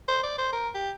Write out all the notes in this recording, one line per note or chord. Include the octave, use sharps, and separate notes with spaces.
C5
D5
C5
A#4
G4